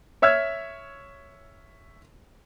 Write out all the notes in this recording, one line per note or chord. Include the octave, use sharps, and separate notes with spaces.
C#5 E5 E6 F6 G#6